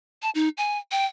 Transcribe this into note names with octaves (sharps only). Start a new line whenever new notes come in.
A5
D#4
G#5
G5